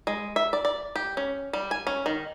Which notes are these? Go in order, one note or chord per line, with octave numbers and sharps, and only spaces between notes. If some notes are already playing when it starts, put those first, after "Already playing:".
G#3
E5
D5
D5
G4
C#4
G3
G#5
C#4
D#3